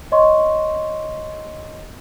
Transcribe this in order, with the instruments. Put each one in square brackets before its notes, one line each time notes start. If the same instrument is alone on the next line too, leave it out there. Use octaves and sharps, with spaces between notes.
[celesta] C#5 D#5 C6 C#6